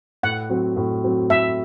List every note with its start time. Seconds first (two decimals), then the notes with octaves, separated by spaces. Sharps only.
0.23 A2 F#5
0.49 F#3 C4 F#4
0.77 A2
1.04 F#3 C4 F#4
1.30 A2 E5